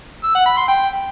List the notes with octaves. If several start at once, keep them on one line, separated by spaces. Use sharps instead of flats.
E6
F#5
B5
C6
G5